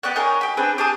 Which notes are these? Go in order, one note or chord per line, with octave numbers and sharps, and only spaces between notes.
B3 G4 D5 F#6
D#4 G#4 A#4 C#5
G4 B5
C4 D4 G#4 B4
G4 G#4 A5 D#6